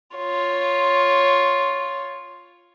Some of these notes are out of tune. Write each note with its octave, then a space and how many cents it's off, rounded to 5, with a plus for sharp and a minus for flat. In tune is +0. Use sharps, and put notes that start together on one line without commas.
F4 +0 C#5 +0